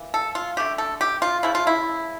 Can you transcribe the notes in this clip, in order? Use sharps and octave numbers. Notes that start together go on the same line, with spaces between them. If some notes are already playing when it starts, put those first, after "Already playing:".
Already playing: E3 A#3
A4
F4
D3 A3 G4
A4
G4
F4
C#3 F3 A3 E4
F4
E4